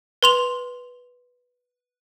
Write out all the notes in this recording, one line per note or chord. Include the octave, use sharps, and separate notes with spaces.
B4 C6 F7